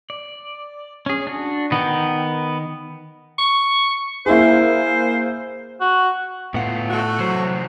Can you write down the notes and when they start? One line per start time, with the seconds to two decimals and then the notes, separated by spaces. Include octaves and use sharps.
0.10 D5
1.06 C#4 G#4
1.27 D4 F#4
1.72 D#3 B3 A#4 G5
3.38 C#6
4.26 A#3 E4 G#4 C5
5.81 F#4
6.54 A2 B3 F4 F#5
6.90 A3 F#4
7.20 E2 C3 F#3 C5